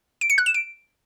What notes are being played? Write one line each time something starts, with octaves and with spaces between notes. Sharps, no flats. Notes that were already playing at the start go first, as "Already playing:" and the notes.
D7
C#7
F#6
E7
D7